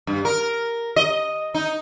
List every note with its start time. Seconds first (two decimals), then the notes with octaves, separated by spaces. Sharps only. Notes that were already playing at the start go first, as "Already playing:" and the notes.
0.07 G2
0.25 A#4
0.96 D#5
1.54 D#4